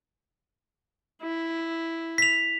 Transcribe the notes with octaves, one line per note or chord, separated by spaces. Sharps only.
E4
B6 F7